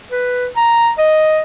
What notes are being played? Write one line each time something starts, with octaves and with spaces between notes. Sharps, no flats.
B4
A#5
D#5